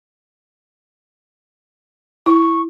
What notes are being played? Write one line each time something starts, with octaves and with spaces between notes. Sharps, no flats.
E4 C#6